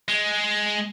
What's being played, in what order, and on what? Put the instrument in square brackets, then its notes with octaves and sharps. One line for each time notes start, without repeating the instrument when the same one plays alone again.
[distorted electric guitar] G#3